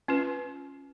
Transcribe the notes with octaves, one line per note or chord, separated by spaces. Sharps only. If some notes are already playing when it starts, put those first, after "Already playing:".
C#4 F4 B4